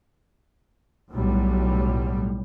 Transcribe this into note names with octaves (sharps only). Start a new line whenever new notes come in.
B1 A2 F#3 G3